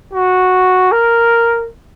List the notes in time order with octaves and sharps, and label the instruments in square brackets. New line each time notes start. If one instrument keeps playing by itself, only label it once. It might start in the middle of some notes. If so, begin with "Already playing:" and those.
[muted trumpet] F#4
A#4